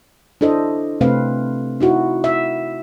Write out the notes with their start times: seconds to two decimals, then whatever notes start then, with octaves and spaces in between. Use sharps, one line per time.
0.41 D4 E4 A4 C5 D#5
1.01 C3 A3 C4 B4 F5
1.80 D#4 E4 F#4
2.24 E5